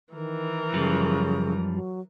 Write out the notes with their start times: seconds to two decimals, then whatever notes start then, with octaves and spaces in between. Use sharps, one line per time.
0.13 D#3 E3 A#4
0.73 F#2 C#3 F3 G3
1.71 F#3